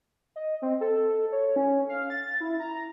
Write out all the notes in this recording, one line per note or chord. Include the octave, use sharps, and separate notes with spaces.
D#5
C4
A4
C#5
C#4
F5
A6
E4
A#5